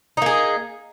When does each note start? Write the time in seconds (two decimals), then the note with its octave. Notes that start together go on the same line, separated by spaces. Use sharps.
0.17 D#4
0.22 A#3
0.26 G#4